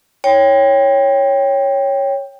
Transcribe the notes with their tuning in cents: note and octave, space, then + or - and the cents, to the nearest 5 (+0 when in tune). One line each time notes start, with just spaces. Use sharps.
C#5 +0 G5 +10